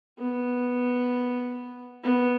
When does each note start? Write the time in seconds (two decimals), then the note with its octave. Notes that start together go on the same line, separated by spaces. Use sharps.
0.19 B3
2.03 B3